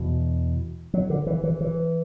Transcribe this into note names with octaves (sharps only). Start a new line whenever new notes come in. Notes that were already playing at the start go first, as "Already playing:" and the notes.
Already playing: E2 B2
F#3
D3
E3
E3
E3